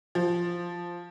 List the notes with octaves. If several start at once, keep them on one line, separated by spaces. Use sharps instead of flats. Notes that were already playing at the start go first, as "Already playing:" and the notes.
F3